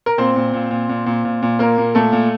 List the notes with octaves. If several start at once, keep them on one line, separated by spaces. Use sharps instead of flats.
A#4
A#2 C4 C5
A#2
A#2
A#2
A#2
A#2
A#2
A#2
A#2 A#3 A#4
A#2
A#2 A3 A4
A#2